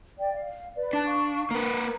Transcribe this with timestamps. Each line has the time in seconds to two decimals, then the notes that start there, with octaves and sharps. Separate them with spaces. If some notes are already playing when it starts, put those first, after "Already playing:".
0.18 D5 G5
0.33 F5
0.76 B4 D5
0.93 D4 A5 F#6
1.05 F5 C#6
1.51 A#3 A#4 B4 A#5